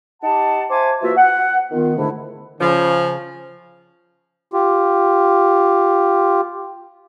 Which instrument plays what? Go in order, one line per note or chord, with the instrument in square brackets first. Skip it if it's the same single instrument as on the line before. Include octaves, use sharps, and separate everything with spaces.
[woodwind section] D#4 G4 F#5 A5
C5 E5 G#5 A5 C6 D6
E3 A#3 F4 F#4 E5
F#5
D#3 B3 F4
G#2 D3 A3 D4 E4
[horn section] C#3 F3
[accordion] F4 G4